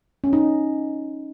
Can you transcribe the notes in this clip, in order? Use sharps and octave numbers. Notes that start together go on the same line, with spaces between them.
C#4
D#4